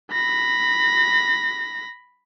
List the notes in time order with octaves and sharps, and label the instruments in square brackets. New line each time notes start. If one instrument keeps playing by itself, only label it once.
[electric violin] B5 A#6